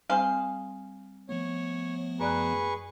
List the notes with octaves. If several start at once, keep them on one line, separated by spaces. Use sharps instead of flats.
G3 C4 G#4 C5 F5
F3 A3 B3 C#5
F#2 G#4 B4 D5 C#6 F#6